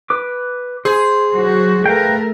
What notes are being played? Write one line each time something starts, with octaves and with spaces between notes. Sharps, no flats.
B4 D6
G#4 C5
F#3 F#4
A3 A#4 B4 F5 G5